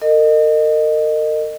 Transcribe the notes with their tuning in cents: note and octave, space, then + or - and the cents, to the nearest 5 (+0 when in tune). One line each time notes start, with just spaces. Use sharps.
A#4 -40 D#5 -20